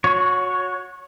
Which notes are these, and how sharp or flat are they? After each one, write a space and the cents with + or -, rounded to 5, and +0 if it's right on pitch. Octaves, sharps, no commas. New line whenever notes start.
F#4 -25 C#5 +5